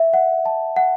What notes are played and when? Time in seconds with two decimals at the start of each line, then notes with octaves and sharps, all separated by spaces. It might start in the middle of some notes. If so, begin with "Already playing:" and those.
Already playing: E5
0.14 F#5
0.46 A5
0.76 F#5